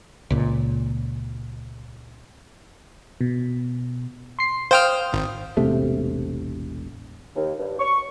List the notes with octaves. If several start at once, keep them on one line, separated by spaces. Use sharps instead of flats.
C#2 A#2
B2
C6 C7
C5 F5 G5 D#6 F6
G#1
E1 A1 C3 A3
D#2
G2
C#6